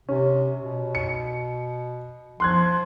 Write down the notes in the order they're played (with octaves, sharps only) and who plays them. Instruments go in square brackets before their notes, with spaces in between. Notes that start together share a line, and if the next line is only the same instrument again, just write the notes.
[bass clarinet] C3 [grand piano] C#4
[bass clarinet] B2
[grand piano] C#7
[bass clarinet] F3 [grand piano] C6 F#6 G#6